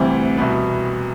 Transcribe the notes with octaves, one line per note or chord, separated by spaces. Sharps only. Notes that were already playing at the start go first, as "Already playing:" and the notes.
Already playing: D2 C3 E3 G3 C4
C2 B2 B3